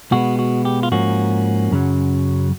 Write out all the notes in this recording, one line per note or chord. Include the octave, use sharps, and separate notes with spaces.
B2 G#3 B3 F#4
F#4
G4
F4
G#2 F3 A#3 C#4 F#4
F#2 C#3 F#3